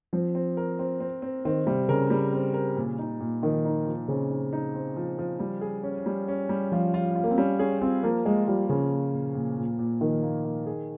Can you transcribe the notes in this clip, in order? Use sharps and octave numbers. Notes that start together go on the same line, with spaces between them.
F3 C4
C4
A#4
C4
C4
C4
D#3 C4
C3 G3
C#3 A#4
G3
C4
A#4
A#2
D#4
A#2
D#3 F3
D#4
F3
C#3 C4
D#4
D#4
C4
F3
F3
G3
G#4
C#4
G3
C#4
G3
F3 F4
F4
F4
A#3
C4
G3 C#4
C#4 G#4
C4 F4
F3 A#3
G#3 A#3
F3 G3
C#3 F3
A#3
A#2
A#2
A#2
A#2
D#3 F3
A#3
A#3
G#4